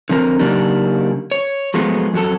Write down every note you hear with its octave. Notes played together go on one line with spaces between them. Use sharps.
D3 F3 C4 A#4
C#3 F#3 A#3 D4 D#4 G4
C#5
F3 F#3 G#3 A3 B3 F4
F2 F#3 A4